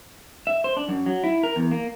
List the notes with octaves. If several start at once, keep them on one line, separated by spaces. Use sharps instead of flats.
E5
C5
D4
F#2
F#3
E4
A#4
E2
A#3